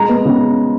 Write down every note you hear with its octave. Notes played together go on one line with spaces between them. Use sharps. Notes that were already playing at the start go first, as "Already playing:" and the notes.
Already playing: G#3 A#5
B3
C#3